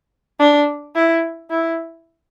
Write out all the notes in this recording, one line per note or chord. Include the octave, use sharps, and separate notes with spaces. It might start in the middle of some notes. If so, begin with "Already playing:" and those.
D4
E4
E4